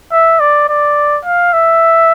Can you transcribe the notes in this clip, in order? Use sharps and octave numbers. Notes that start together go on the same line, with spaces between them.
E5
D5
D5
F5
E5